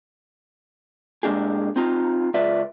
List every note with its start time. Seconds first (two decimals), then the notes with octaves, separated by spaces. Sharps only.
1.23 A2 G#3 A#3 D4 G4 G#4
1.76 C4 D#4 F4 A#5
2.34 C#2 F4 B4 D5 E5